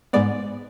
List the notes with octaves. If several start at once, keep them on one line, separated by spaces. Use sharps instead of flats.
G#2 G#3 B3 D5